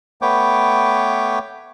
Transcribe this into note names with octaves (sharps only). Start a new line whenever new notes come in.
A3 B3 B4 C#5 G5 D6